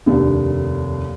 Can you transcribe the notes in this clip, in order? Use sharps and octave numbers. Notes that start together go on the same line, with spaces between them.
F1 D#2 D4